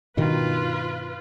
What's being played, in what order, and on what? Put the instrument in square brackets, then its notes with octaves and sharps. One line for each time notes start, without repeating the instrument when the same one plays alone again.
[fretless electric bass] G2 B2 D#3 [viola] F4 B4